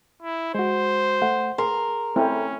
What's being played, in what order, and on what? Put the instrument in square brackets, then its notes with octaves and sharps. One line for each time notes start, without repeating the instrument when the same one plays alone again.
[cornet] E4
[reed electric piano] G#3 F#4 [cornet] C5
[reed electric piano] A3 F#5
[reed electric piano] G#4 C6 [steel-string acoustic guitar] A#4
[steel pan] A3 C4 E4 [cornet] C#4